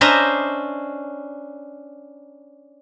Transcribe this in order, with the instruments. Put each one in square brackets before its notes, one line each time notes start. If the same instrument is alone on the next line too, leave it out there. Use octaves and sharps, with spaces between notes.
[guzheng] C#4 D4 C5 D#5 E5 A#5